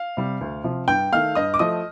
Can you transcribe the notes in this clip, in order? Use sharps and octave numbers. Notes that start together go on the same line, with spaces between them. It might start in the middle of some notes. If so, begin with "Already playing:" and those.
Already playing: F5
C3 G3
D2
C3 F3
G2 G5 G6
D#3 A3 F5 F6
G2 D#5 D#6
D6
F3 A3 D#5 D#6